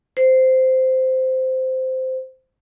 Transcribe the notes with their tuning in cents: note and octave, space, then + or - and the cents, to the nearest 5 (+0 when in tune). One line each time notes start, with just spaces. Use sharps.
C5 -10